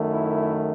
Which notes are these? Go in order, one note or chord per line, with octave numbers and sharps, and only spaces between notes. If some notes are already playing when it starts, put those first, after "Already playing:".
Already playing: F#2 D#3 A3
E4